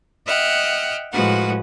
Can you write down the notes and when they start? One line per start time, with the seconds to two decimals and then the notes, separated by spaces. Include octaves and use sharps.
0.27 D#5 E5 F#5 G5 F6
1.13 A2 F3 G#3 F#4 B4 F#5